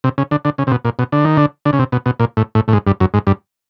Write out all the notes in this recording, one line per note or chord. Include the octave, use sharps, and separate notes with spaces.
C3
C#3
D3
D3
C#3
C3
B2
A#2
B2
D3
D#3
D3
D3
C#3
C3
B2
B2
A#2
A2
A2
A2
G#2
G2
F#2
G#2
G2